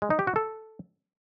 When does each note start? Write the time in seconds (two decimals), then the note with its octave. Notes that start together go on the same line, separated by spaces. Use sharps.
0.02 G#3
0.10 D#4
0.19 G4
0.27 F#4
0.36 A4